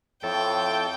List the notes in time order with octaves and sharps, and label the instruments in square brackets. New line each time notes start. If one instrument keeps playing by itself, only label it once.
[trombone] F2 [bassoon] A2 [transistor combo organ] A4 [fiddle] G5